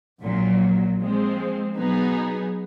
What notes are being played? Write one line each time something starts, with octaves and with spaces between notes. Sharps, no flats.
A#1 A#2 F#3
F3 G#3 C4
B2 F#3 B3 D#4 G#4